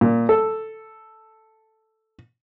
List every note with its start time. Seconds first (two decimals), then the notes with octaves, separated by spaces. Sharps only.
0.01 A#2
0.29 A4